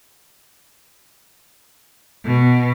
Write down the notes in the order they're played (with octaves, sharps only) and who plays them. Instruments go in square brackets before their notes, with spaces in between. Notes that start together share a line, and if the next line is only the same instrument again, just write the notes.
[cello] B2